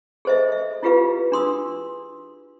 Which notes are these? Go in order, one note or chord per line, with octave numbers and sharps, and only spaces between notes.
G#4 A4 C5 D#5 E5
E5
E4 F4 G4 G#4 B4 F5
D4 G#4 C6 D#6 E6